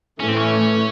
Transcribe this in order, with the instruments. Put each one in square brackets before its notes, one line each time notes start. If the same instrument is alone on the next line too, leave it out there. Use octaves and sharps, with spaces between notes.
[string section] A2 E3 A3 [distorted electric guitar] C#4
[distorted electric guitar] C4
C#4